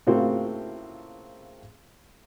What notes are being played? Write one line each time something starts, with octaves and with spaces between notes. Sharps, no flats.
A2 C#3 A#3 C4 F4 F#4